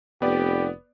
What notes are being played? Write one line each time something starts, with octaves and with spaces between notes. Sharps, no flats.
F1 B3 G4 D5